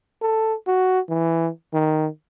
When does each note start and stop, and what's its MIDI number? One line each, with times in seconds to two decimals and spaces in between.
0.22 0.54 69
0.67 1.00 66
1.09 1.49 52
1.73 2.07 51